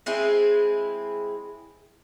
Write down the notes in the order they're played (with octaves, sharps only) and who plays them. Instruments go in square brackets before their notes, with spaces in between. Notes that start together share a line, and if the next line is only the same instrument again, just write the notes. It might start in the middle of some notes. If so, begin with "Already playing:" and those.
[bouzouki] G#3 C4 E4 G#4